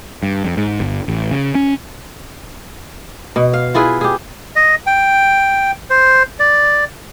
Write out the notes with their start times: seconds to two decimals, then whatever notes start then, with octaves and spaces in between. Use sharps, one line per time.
0.23 G2
0.44 F2
0.57 G#2
0.80 G1
1.08 A1
1.31 C#3
1.55 C#4
3.36 B2
3.53 F5
3.74 E4 F4 G#4 B4
4.01 G4 G#4
4.56 D#5
4.87 G5
5.90 C5
6.40 D5